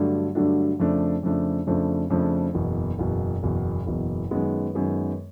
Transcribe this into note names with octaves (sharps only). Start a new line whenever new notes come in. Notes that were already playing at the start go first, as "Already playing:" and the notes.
Already playing: G2 D3 F#3 A3 D4
G2 D3 F#3 A3 D4
F2 C#3 F3 A3 D4
F2 C#3 F3 A3 D4
F2 C#3 F3 A3 D4
F2 C#3 F3 A3 D4
F#1 E2 B2
F#1 E2 B2
F#1 E2 B2
F#1 E2 B2
F#2 D#3 G#3 B3
F#2 D#3 G#3 B3